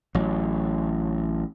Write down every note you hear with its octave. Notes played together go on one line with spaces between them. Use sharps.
A1 F#3